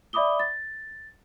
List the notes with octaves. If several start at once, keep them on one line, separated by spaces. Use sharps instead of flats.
D5 E5 B5 D6 D#6 G7
A6